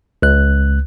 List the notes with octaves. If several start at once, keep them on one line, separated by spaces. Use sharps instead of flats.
C#2 F#6